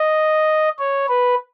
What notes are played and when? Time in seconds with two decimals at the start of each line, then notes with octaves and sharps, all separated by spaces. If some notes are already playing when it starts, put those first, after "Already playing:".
Already playing: D#5
0.79 C#5
1.08 B4